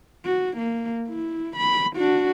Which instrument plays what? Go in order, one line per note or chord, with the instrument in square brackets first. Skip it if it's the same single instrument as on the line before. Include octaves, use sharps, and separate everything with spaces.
[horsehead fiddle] F#4
A#3
E4
B5
D4 F#4